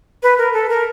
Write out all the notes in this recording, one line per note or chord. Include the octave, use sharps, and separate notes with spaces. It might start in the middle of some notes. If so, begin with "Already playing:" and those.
B4
A#4
A4
A#4